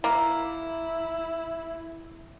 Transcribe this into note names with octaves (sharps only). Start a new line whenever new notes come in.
A#3 E4